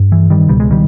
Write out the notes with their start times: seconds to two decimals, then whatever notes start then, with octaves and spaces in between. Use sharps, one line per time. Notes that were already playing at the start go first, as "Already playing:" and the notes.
Already playing: G2
0.12 E3
0.30 D#3 G3
0.49 C#2 B2 G3
0.60 G#3
0.71 D#3 G3